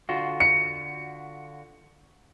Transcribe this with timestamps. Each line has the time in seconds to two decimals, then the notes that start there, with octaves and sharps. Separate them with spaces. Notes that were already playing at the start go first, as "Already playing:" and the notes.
0.09 D3 F4 F#4
0.40 C#7